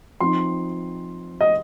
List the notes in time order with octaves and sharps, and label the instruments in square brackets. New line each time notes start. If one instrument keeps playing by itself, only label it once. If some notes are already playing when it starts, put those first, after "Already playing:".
[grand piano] F3 C4 D#4 C6
D#5